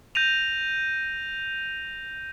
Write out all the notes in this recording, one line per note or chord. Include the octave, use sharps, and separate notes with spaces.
G6 A#6 D#7 F7